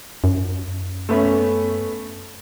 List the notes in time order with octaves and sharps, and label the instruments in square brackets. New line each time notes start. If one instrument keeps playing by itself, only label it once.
[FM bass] F#2
[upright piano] A3 B3 C#4